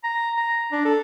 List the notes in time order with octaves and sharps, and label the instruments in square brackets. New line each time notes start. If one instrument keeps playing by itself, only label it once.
[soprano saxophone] A#5
A#5
D4
A4